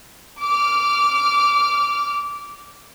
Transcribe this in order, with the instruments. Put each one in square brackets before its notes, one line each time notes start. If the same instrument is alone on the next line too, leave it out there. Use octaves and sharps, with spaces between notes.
[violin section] D6 F6